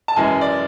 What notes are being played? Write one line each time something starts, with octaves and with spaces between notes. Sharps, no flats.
A5
F#2 E3 G#3 G#5
D5